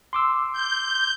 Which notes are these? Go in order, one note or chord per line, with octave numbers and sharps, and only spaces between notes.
C6 D6 E6
G6